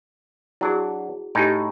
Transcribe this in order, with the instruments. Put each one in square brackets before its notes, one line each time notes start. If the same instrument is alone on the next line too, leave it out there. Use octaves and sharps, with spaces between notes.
[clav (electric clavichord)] F#3 D4 [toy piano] E4 F#4 G#4
[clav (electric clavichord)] A2 D#4 [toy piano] G4 G#5